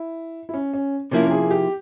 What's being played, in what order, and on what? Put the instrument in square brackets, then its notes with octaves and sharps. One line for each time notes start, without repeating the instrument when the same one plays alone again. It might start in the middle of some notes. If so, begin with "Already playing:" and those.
Already playing: [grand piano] E4
E4
C#4
C#4
[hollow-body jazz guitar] C3 F3 A#3 E4 [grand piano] C#4
[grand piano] A#4
G#4
G4